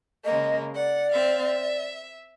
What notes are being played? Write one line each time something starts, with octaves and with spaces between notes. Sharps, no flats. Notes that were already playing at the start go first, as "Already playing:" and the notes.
C#3 G#3 A#3 D#5
D5 F#5
C4 E5 F5
E5